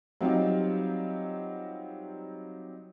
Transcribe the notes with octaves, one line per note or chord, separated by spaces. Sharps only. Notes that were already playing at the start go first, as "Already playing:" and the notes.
F#3 G3 C4 D#4 F4 G4